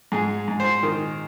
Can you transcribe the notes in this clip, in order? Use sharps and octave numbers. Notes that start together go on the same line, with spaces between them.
G#2 G#4
G#2
C5
D#3